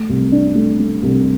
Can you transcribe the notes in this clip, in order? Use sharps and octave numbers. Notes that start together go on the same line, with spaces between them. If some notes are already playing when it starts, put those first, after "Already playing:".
Already playing: A3
C2
D4
A3
A3
C2